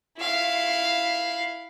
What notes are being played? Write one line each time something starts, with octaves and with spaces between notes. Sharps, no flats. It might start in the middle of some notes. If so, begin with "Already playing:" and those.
E4 F5